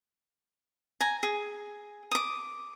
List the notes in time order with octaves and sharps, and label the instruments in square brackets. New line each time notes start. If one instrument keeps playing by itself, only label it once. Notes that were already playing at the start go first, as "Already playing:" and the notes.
[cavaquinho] G#5 A#5
G#4
D6 D#6